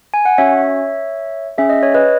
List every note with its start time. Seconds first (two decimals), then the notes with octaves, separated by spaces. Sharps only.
0.14 G#5
0.25 F#5
0.38 C#4 F#4 C#5 E5
1.58 C#4 G#4 E5
1.69 D#5
1.83 C#5
1.94 B4 D#5